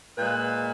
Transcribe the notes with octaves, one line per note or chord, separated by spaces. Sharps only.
A#2 G#3 B4